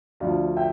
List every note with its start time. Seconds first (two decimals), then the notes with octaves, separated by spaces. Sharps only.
0.20 D2 D3 F3 D5 F5
0.57 E5 G5